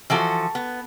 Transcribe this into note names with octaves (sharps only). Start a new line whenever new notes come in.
E3 F3 F#4 A4
B3